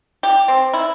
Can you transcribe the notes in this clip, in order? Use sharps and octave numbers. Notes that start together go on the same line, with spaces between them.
G4
C4
E4